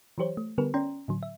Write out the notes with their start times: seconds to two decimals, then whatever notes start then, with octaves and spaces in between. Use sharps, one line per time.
0.18 E3 F#3 G4 C5 C#5
0.37 A3
0.58 D3 G3 B3 G4 A#4 B4
0.74 C#4 D5 G5 A#5 C6
1.08 A2 D3 F#3
1.23 E5